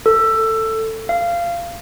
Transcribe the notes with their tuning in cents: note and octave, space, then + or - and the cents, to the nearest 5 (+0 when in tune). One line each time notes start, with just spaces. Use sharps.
A4 +15
F5 -20